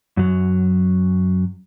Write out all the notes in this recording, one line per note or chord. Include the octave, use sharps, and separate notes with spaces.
F#2 F#3